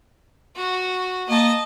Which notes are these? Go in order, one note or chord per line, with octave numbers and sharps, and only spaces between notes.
F#4
A#3 D#5 A5